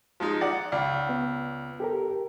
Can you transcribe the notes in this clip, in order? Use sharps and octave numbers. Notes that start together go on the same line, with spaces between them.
F3 G#3 D#4
D5 F#5
C#2 D5
B3
G4 A4 A#4